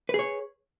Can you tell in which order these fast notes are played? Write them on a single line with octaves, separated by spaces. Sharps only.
B4 G#4 C#5